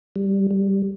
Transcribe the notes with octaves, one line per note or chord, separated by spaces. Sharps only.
G3
G3